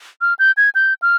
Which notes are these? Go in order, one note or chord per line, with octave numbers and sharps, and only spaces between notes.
F6
G6
G#6
G6
F6